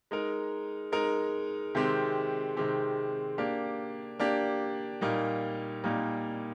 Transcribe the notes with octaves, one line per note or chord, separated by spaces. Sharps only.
G#3 D#4 A#4
G#3 D#4 A#4
C3 D#3 G#3 C4 G4
C3 D#3 G#3 C4 G4
A#3 D4 G4
A#3 D4 G4
A#2 G3 A#3 D#4
A#2 G3 A#3 D#4